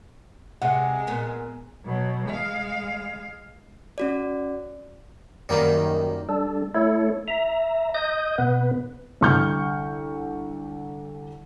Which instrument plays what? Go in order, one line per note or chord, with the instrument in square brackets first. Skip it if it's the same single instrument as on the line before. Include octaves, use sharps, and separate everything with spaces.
[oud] C3 [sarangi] G#3 [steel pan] F#5
[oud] A#2 B3
[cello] B2 F#3
G#3 F5
[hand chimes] C#4 F#4 D5
[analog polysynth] F#2 D#3 [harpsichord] G3 A#3
[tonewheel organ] G3 D4 A4
A3 E4 A4 C#5
E5 A#5
D#5 D#6 G6
B2 B3 B4
[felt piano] C2 D3 C#6 F6 G6